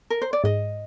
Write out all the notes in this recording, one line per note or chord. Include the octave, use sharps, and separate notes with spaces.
A#4
C5
D5
G#2 D#5